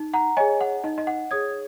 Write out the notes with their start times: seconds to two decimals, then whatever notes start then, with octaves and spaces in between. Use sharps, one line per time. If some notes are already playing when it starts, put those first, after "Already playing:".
Already playing: D#4
0.14 F#5 A#5
0.37 G#4 C#5 D#5 G#5
0.61 F#5
0.84 D#4 D#5
0.98 D#5
1.07 F#5
1.31 G#4 C#5 D#6 G#6